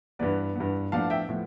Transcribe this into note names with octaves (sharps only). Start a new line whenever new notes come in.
G2 E3 B3 B4 D5
G2 E3 B3
A2 F3 B3 D4 F5 A5
E5 G5
A2 F3 B3